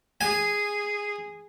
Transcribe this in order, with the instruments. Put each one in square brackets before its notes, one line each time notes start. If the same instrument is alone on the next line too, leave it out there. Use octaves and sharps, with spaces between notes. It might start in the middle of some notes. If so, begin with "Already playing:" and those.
[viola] G#4 [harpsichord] G#5